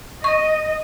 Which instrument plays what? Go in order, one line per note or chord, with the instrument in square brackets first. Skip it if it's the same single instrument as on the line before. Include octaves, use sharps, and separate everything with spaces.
[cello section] D#5 [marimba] C#6